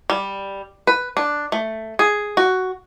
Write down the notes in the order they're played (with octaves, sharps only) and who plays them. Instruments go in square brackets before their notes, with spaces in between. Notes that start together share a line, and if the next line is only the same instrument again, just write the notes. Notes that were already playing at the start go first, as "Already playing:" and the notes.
[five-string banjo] G3
B4
D4
A3
G#4
F#4